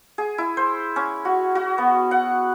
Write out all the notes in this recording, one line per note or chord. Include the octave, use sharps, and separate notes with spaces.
G#4
E4
C5
C#4
F#4
F#4
B3
F#5